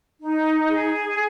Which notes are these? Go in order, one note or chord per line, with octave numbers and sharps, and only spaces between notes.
D#4
G#4